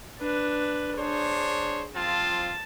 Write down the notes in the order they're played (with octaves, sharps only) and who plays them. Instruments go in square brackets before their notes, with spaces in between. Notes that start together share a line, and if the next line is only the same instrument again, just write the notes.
[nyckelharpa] D4 B4
[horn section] D4 C5 C#5 [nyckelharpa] G#4
[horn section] F3 C4 F4 [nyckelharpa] A5